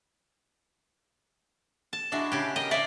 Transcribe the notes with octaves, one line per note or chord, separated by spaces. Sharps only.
A5
G#3 D4 E4 F#4
C#3 G4
G4 A#4 D#5
E4 D5 F5